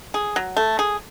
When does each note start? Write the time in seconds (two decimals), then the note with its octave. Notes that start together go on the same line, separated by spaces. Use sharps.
0.14 G#4
0.36 F#3
0.57 A3
0.79 G#4